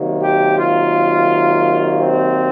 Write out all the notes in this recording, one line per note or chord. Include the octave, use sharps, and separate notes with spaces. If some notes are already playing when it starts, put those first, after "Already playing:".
Already playing: C3 D#3 F#3 A#3
G4
F4
C4